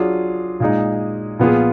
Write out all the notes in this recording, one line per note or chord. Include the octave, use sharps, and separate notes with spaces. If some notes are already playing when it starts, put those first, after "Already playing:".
Already playing: F#3 D4 F4 G#4
A#2 G#3 D#4
A#2 F3 B3 F4 G#4